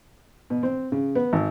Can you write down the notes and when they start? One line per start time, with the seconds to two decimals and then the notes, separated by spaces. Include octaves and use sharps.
0.50 B2
0.63 C4
0.92 C#3
1.15 B3
1.33 G#1